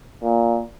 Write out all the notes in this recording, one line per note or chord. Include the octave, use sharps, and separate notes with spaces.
A#2